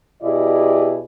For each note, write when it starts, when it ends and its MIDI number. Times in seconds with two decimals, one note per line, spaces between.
0.23 1.01 47
0.23 1.01 64
0.23 1.01 67
0.23 1.01 68
0.23 1.01 74
0.23 1.01 75